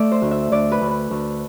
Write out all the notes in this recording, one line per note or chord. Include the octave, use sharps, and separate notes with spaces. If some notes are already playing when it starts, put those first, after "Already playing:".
Already playing: A3 D5 E5
C5
D2
E5
D2 D5
B4
D2
B4
D2